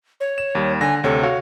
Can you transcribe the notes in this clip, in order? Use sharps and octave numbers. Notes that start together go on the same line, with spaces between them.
C#5
E7
D#2 G3
D3 G#5 A#6
D2 C3 A4 C#5
F#4 C#5 F5